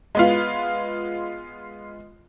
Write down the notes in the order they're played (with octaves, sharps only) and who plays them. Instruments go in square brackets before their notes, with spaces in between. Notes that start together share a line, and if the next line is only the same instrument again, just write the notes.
[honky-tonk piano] G#3 B3 F4